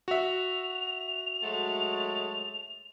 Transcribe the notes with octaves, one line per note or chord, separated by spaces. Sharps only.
F#4 E5 F7
F#3 G#3 A3